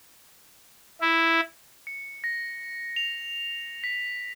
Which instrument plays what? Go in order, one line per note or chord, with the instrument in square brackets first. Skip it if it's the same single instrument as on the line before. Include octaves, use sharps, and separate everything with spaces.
[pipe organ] E4
[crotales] C#7
A#6
F7
B6